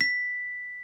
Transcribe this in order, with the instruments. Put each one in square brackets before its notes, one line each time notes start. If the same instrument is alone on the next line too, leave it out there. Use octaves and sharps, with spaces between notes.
[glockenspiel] B6